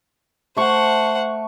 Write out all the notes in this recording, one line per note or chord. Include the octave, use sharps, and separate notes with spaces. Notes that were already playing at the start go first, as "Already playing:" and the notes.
A3 C5 F#5 C#6